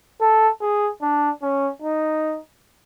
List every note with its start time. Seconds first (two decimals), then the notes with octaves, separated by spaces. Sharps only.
0.21 A4
0.61 G#4
1.02 D4
1.42 C#4
1.82 D#4